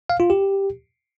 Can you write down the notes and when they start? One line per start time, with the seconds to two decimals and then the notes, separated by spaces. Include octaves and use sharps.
0.10 F5
0.20 F4
0.30 G4